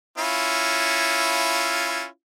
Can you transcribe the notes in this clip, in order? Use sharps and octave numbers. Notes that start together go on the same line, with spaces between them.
C#4 E4 F4